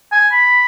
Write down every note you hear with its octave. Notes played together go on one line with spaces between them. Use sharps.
G#5
B5